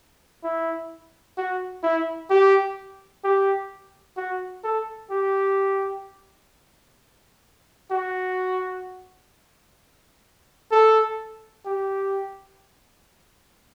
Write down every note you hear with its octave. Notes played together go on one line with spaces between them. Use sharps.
E4
F#4
E4
G4
G4
F#4
A4
G4
F#4
A4
G4